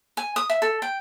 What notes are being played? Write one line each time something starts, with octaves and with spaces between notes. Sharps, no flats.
G#5
D#6
E5
A4
G5